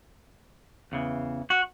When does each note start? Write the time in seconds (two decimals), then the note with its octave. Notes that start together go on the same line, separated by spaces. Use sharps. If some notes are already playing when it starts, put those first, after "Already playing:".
0.92 E2 C#3 E3
1.50 F#4